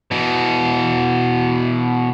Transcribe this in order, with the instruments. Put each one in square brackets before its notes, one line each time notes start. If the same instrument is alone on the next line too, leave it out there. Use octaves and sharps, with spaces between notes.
[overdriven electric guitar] B2 E3